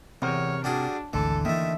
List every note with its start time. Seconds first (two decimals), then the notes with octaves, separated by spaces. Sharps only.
0.22 E2 C3 C4 A#4 C#5
0.64 G3 D4 F#4 G#4
1.13 G#1 D2 D3 E3 A3 A4
1.45 D#3 E3 A3 A#3 E5